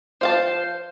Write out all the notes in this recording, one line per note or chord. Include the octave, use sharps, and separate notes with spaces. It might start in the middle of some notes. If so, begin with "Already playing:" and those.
F3 C5 F5 A5